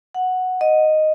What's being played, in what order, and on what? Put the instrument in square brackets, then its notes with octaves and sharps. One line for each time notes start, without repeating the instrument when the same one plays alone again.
[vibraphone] F#5
D#5